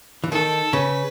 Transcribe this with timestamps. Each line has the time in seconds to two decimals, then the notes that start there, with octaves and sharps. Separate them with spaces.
0.24 E3
0.32 D#3 A4
0.73 C#3 B4